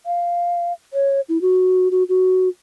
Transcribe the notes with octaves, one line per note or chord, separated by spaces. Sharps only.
F5
C#5
E4
F#4
F#4
F#4